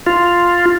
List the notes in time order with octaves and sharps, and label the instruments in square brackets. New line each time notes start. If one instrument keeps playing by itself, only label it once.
[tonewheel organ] F4